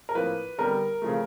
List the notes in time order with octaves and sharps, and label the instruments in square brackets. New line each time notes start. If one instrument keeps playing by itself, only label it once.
[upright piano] A#4
A2 F3 A#3 B4
D3 G3 B3 A#4
C#3 F3 A3